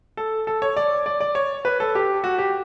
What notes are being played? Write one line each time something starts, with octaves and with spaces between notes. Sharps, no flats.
A4
A4
C#5
D5
D5
D5
C#5
B4
A4
G4
F#4
G4